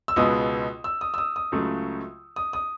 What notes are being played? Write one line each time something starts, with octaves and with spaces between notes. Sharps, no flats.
E6
C#2 B2 G#3 B3 D#6
E6
D#6
E6
D#6
D#6
C#2 C#3 F#3 A3
D#6
D#6